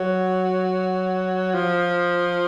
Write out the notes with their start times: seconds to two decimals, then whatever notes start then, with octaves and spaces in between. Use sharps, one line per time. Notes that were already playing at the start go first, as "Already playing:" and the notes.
Already playing: F#3
1.54 F3